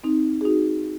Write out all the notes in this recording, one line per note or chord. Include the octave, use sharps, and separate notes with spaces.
C4 D#4
G#4
D#4 F#4